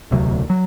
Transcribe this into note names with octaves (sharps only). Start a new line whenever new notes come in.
E1 D2 C3 F#3
F#3